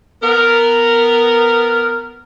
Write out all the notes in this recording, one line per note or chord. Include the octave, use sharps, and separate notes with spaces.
B3 A#4